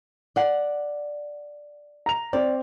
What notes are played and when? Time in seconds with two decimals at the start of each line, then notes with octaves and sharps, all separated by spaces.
0.36 D5 F#5
2.06 A#5 F7
2.33 C4 D5